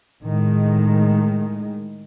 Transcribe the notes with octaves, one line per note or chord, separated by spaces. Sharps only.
A2 D#3 G#3